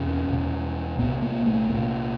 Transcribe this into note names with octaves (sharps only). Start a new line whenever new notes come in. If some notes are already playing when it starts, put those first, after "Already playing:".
Already playing: E2 B2 C#4
E2 B2
C2 A#2 B3
A#3
A3
C2 A#2 A#3